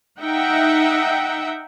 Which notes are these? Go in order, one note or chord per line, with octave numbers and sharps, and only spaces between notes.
D#4 E5 F#5 G5